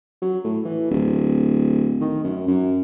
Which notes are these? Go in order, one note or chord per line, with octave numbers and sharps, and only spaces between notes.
F#3
A2
E3
D1
D#3
F#2
F#2